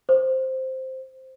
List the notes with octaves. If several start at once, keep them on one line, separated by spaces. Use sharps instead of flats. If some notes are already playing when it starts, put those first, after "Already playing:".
C5